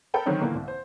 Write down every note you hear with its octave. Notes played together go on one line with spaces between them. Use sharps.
A4 A#4 G5 B5
D3 D#3 F#3 C4 C#4 D#4
A#2 D3 E3 A#3
C2
C5